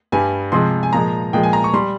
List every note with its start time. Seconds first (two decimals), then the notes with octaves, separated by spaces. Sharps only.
0.12 G2 G3 G#5
0.52 C3 F3 G#3 C6
0.83 G#5
0.93 A#2 F3 G#3 A#5
1.33 A#2 F3 G#3 G5
1.43 G#5
1.53 A#5
1.64 C#6
1.73 G3 C6